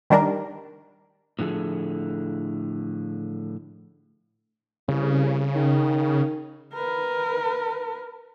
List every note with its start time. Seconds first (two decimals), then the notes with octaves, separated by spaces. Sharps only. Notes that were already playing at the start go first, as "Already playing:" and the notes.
0.10 D#3 G3 D4 A#4
1.39 A2 D3 F3 G#4 A4
4.88 C2 C#3
5.55 D#3
6.74 A#4 B4